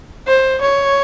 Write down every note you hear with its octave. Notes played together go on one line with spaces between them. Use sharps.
C5
C#5